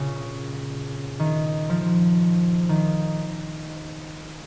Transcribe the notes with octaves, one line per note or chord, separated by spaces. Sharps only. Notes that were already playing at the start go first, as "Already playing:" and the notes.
Already playing: A#2 C#3
D#3
F3
D#3